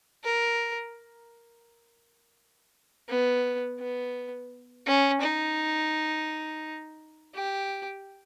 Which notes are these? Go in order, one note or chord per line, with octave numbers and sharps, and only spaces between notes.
A#4
B3
B3
C#4
D#4
G4